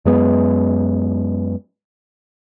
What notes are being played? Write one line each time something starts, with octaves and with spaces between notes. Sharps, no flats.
F#2 G#3 B3